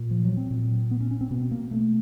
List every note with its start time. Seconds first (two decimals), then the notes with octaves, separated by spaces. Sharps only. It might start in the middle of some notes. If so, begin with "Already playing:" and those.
Already playing: A#2
0.11 F3
0.25 F#3
0.37 C4
0.51 A#2
0.91 B3
1.01 C#4
1.11 C#4
1.21 C4
1.31 B2 B3
1.51 A#3
1.71 A3